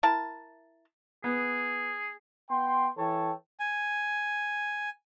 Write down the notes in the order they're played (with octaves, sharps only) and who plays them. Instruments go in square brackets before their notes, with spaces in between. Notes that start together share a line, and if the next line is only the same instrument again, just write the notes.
[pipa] E4 A#4 A5
[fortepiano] B3 [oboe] G#4
[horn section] B3 G5 C6
E3 A4 C#5 G5 A5
[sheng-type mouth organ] G#5